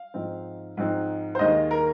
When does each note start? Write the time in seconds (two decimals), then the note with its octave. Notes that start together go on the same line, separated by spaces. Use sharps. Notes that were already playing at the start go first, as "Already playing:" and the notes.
Already playing: F5
0.14 G#2 F3 C4 D#4
0.77 G#2 F3 C4 D#4
1.35 C5
1.39 D#2 D#3 G#3 D#5
1.71 A#4